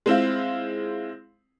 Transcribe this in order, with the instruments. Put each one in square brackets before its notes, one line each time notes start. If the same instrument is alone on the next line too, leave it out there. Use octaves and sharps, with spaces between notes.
[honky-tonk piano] G#3 C4 E4 F4